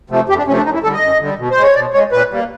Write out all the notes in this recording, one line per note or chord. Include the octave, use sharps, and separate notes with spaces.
C3 F3 A3
F2 G4
D4
C3 F3 A3 C#4
D4
F#2 D#4
E4
D3 G3 A4
D#5
F#2
D3 G3
B2
C5
G#3
C#5
B2 D5
G#3 C#5
A#2 B4
G3 A#3